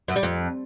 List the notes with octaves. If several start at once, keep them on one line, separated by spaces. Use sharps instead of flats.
F#2
G3
F2